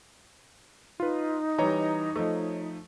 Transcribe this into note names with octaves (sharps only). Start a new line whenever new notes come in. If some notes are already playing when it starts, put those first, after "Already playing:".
D#4 F4 B4
E3 G3 C#5 D#5 A#5
F3 A3